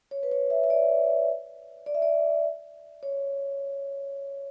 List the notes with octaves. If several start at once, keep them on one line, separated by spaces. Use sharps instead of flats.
C#5
B4
C#5
E5
E5
D5
D5
E5
D5
C#5